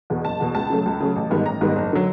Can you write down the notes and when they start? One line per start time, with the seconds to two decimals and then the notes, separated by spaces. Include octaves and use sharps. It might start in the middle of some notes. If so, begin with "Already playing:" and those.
0.10 E2 B2
0.25 F#1 A5
0.40 E2 B2
0.55 C#2 A5
0.70 C#3 F#3 A3
0.86 C#2
1.00 C#3 F#3 A3
1.16 A1
1.30 G#2 D#3 G3 B3
1.46 A1 A#5
1.61 G#2 D#3 G3 B3
1.76 F#1
1.93 D3 F#3